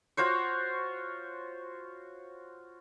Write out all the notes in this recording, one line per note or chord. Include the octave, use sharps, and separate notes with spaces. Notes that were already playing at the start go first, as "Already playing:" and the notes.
F4 F#4 C5 C#5